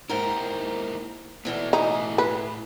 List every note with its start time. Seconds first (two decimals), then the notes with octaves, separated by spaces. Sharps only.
0.09 G#2 A#3 D#4 E4 G4 A#4
1.45 B2 E3 A3 B3 D5
1.73 A2 D#4 E4 G#5
2.18 B4